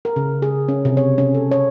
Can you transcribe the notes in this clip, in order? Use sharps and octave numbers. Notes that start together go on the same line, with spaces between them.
A#4
C#3
G#4
C#4
C3
C#5
C#4
A4
C#5